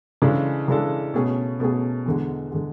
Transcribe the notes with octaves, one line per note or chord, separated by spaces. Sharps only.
C#3 E3 G#3 D4 A4
C#3 E3 G#3 D4 A4
B2 A3 C#4 G#4
B2 A3 C#4 G#4
E2 D3 G#3
D3 G#3